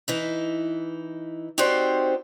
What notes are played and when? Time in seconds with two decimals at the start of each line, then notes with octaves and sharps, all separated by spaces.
0.08 E3 D#4 E4
1.58 C4 D#4 F#4 G4 C5 D5